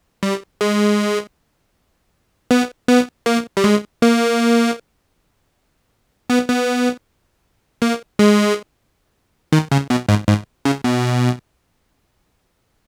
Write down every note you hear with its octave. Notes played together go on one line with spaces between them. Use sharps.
G3
G#3
B3
B3
A#3
G3
G#3
A#3
B3
B3
A#3
G#3
D#3
C#3
B2
G#2
G#2
C#3
B2